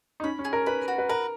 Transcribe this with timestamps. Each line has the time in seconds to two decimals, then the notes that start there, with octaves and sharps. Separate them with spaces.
0.20 D#4
0.23 C#4 B5
0.39 C#4
0.45 G#4
0.53 A#4
0.66 B4 B5
0.88 F#4
0.98 B4
1.09 A#4 B4